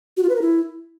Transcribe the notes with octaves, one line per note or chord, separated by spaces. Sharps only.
F#4
F4
B4
A#4
E4